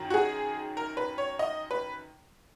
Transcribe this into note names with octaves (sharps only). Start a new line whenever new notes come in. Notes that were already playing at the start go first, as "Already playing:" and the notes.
Already playing: F#2 D#3
F#4
G#4
A#4
B4
C#5
D#5
B4